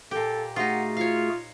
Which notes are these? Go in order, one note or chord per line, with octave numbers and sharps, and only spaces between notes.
A#2 G4 A4
A3 D#4 F4 F#4 G#4 F#5
F4 C#5 F5